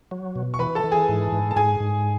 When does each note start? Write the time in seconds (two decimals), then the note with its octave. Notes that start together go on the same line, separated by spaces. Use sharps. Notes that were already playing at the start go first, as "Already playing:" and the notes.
0.11 F#3
0.36 B2
0.54 C#6
0.59 E3 B4 B5
0.75 A4 A5
0.84 E3
0.91 G#4 G#5
1.09 G#2
1.32 G#2
1.51 A5
1.56 G#2 G#4 G#5
1.80 G#2